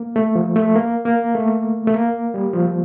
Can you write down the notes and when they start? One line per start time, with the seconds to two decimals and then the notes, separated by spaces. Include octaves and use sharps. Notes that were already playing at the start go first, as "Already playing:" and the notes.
Already playing: A#3
0.16 A3
0.35 F3
0.56 A3
0.76 A#3
1.05 A#3
1.35 A3
1.87 A3
1.94 A#3
2.34 G3
2.53 F3